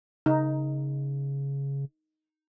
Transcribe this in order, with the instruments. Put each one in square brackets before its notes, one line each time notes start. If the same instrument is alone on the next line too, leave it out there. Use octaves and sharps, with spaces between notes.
[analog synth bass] C#3 [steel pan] D#4